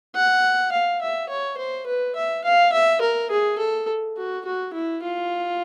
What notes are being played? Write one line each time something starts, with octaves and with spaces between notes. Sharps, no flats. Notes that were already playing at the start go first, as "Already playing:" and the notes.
F#5
F5
E5
C#5
C5
B4
E5
F5
E5
A#4
G#4
A4
F#4
F#4
E4
F4